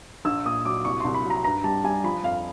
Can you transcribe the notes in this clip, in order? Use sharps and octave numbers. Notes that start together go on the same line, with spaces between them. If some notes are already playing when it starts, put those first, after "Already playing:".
A#1 E6
A#2 D#6
F#3 D6
C2 C#6
C2 C6
B5
F#3
A#5
G2 A#5
G3 A5
G3 G#5
F3 B5
F2 F5